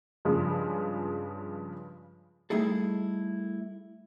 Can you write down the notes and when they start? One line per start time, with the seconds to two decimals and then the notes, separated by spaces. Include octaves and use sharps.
0.25 G2 C#3 F3 G#3
2.50 G3 A3 D#4 E4 G#4 A4